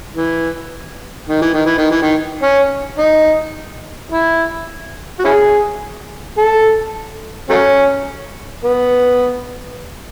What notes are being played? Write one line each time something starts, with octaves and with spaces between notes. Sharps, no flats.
E3
D#3
E3
D#3
E3
D#3
E3
D#3
C#4
D#4
E4
F#4
C#4 E4 G#4
A4
F#3 A3 C#4
B3